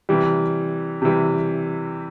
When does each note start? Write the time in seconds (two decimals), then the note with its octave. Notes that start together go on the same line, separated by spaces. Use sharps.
0.09 C3 E3 G3
1.02 C3 E3 G3